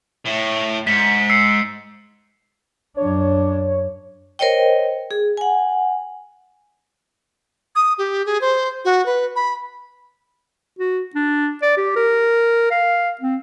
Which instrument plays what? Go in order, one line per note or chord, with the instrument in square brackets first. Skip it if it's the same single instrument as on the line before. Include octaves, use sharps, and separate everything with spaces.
[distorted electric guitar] A2
[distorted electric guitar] G#2 [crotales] B6 C#7
[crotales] E6 C7 C#7
[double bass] F#2 D4 [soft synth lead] C#5
[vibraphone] A#4 C5 C#5 D#5 G5
G#4
F#5 G#5
[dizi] D#6
G4
G#4
C5
F#4
B4
B5
[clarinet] F#4
D4
D5
G4
A#4
F5
C4